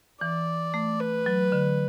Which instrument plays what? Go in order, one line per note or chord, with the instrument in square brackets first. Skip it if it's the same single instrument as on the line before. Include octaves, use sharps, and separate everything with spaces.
[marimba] E3 [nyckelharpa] D5
[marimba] A3
[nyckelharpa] B4
[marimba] F#3
D3